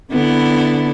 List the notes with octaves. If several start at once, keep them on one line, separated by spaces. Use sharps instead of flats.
D3 B3 E4